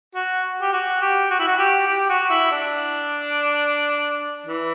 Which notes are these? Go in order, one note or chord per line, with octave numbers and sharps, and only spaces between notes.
F#4
G4
F#4
G4
F#4
E4
F#4
G4
G4
F#4
E4
D4
E3